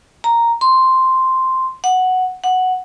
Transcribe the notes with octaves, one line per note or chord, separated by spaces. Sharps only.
A#5
C6
F#5
F#5